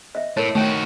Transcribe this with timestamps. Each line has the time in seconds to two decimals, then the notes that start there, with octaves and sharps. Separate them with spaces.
0.15 D#5 E5
0.37 A2 A#4 C#5 A5
0.55 D#3 A3 F#4 G5